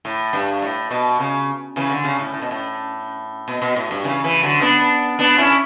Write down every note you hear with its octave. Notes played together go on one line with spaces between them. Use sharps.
A2
G2
A2
B2
C#3
C#3 E3
D3
C#3
A2
A2
B2
A2
B2
B2
A2
G2
C#3 E3
C#3 E3
D3 F#3
B3 D4
B3 D4
C#4 E4